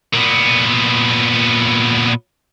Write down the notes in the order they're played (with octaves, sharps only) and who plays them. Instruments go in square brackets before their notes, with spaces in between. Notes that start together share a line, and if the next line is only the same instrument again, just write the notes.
[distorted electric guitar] A#2 B3